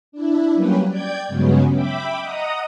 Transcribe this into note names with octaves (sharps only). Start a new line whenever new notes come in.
D4 E4
F#3 G3 A#3 C#4 G4 B4
D5 G5 G6 G#6
G2 C#3 F#3 G#3 B3 C#4
E5 G5 B5 D6
D#5 F#5 A#5 D#6